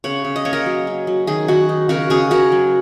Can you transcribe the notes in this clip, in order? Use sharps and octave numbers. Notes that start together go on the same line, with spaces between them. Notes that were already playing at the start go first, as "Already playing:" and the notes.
C#3 C#5 F#5
C#3
D#5
A#3 C#5
A#4 D#5
F#3
C#4
F#3
D#3 G#4
D#3 F#4
D#4
C#3 F#4 A#4
C#3 G#4 C#5
C#3 F#4 A#4
F#3